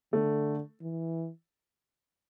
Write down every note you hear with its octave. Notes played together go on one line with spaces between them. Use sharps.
D3 A3
E3